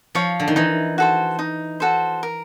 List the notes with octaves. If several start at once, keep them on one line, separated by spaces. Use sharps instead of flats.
F3 C#5 F5
D3
D#3
E3 D#4
F#4 A4 C5
D#4
F#4 A4 C5
A#4